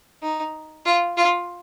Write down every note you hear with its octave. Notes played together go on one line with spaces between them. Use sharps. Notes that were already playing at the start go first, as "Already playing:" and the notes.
D#4
F4
F4